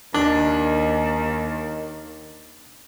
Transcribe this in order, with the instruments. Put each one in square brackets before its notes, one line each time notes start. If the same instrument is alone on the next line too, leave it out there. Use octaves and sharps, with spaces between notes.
[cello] D#2 [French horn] D#3 [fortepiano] D4